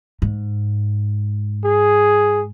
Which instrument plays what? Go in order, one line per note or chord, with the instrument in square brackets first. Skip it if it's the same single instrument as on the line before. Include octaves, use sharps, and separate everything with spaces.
[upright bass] G#2
[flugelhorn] G#4